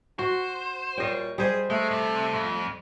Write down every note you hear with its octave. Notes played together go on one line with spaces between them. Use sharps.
F#4 C5
A#2 G3 C#5 D#5 G5
G3 G#4 C5 D#5
G#3 A3
C3
F2